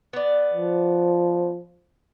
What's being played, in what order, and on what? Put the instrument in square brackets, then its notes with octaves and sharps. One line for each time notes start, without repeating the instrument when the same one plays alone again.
[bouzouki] B3 D5
[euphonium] F3